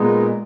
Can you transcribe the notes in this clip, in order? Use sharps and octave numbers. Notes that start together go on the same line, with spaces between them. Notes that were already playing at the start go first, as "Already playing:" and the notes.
Already playing: A#2 G#3 B3 D#4